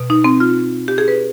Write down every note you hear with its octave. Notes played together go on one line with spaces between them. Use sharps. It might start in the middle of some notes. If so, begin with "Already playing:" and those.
Already playing: B2
D#4
C4
F4
G4
G#4
B4